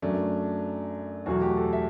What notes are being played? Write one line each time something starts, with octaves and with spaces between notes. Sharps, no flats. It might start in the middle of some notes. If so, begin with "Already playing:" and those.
F#2 F#3 A3 D4
E2 B2 F#3 A3 F#4
G4
A4
E5